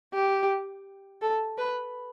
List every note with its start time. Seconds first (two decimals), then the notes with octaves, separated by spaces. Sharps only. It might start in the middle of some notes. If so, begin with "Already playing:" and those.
0.14 G4
1.22 A4
1.58 B4